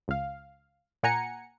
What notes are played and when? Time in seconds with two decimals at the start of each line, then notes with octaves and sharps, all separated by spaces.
0.08 C#2 F5
1.03 A#2 F#5 G#5 A#5 C#7